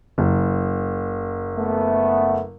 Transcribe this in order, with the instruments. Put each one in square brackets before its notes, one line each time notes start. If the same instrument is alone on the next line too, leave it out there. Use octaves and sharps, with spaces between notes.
[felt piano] F#1
[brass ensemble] A3 B3